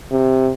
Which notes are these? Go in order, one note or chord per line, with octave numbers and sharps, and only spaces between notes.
C3